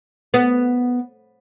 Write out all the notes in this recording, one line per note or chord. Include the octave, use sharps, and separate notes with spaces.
B3